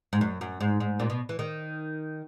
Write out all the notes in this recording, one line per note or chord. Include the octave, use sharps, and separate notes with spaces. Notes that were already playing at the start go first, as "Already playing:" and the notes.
G#2
F#2
F#2
G#2
G#2
A#2
B2
E3
D#3